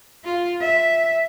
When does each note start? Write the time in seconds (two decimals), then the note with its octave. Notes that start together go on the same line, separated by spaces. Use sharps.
0.25 F4
0.62 E5